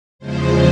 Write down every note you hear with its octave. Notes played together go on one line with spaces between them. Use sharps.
E2 C#3 F3 G#3 C5